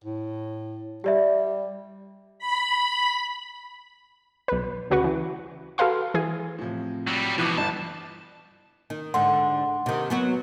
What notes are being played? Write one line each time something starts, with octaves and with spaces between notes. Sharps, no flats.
A2
G3 G4 D5 E5
B5
B1 B4
D2 C#3 F#4 B4 C#6
E3
F#4 A4 B4 F5 C6
E3 G#4
A2 C3 F3
F#3 G3
C#2 B2 E3 F3 D6 F#6 G6
G1 A5
D#3
G#2 D3 F#5 C6
C3 D#3
F#3 B3 F#4